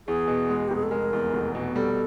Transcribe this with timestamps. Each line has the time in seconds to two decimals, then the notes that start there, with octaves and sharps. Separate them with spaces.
0.07 E2 G#4
0.28 B2
0.50 G#3
0.68 G4
0.71 F1
0.76 G#4
0.83 A4
0.91 G#3 A#4
1.13 E2
1.33 F1
1.55 B2
1.76 G3 A4